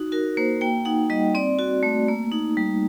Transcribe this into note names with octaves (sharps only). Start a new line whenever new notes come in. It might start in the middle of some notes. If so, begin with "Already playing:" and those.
Already playing: D#4 F#4
F#4 A#4
A#3 C5
A#3 G5
D#4 F#5
G3 D#5
C4 D5
F#4
A3
A#3
D#4
G3